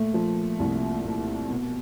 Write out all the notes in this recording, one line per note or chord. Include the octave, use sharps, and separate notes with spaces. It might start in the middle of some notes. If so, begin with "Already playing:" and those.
Already playing: A#2 A3
F3
C2
A#2
B2